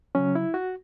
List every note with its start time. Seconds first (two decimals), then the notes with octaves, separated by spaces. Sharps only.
0.15 C#3 F#3 C#4
0.35 E4
0.54 F#4